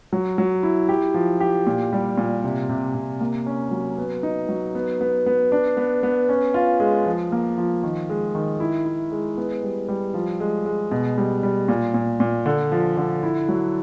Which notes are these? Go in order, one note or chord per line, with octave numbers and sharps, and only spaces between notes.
F#3
F#3
E4
G4
F3
G4
A#2
G3
A#2
C3
C3
C3
A#3
C#4
F#3
B3
D#4
F#3
B3
B3
B3
D4
B3
B3
C#4
F4
G#3
F3
A#3
F3
D#3
G#3
D#3
E4
E4
G#3
B3
G3
G3
F3
G#3
G#3
B2
G3
G3
A#2
A#2
A#2
D3
F3
D3
E4
F#3